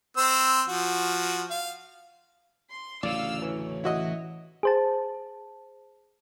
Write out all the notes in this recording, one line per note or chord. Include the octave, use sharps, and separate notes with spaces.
C4 C5 E6
F3 F#4
F5
C6
A1 D2 C#3 D5 F5 E6 F6
E3 C#5
E3 E4 F#4 D#5
G#4 C5 A5